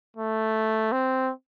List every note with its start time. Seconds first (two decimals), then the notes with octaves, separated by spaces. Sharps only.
0.17 A3
0.92 C4